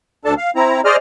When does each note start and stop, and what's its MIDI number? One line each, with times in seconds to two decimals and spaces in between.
0.25 0.34 38
0.25 0.34 62
0.25 0.34 69
0.25 0.34 81
0.37 0.51 77
0.56 0.81 60
0.56 0.81 64
0.56 0.81 82
0.85 0.96 68
0.85 0.96 72
0.85 0.96 74
0.85 0.96 75
0.85 0.96 89